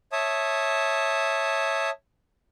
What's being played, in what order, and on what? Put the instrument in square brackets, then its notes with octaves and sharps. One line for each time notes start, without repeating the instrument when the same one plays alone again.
[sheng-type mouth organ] C#5 E5 A5 D#6